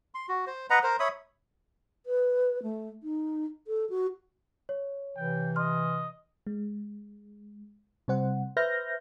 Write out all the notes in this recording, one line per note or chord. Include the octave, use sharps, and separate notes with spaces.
C6
F#4
C5
B4 D#5 F#5 A#5
A#4 C5
C#5 E5 B5 D#6
B4
A3
D#4
A4
F#4
C#5
C3 E3 G5
D#5 C6 F6
G#3
C3 G3 C5 F#5
B4 C5 E5 F6 G6 A#6